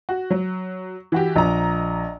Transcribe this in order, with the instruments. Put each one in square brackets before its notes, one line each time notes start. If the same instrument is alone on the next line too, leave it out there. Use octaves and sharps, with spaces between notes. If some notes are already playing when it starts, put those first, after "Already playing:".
[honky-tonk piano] F#4
F#3
E3 F#4 G4
[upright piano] A#1 [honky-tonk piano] D#5 A#5